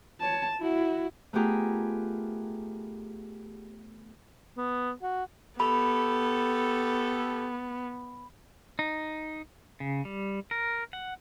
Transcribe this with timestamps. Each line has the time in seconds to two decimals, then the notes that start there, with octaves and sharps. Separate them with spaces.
0.20 C#5 A5
0.58 E4 F#4
1.33 A3 B3 F4 G4 G#4 A#4
4.57 B3
5.02 F#4
5.60 B3 G4 A4 B5
8.79 D#4
9.80 C#3
10.05 G3
10.51 A#4
10.93 F#5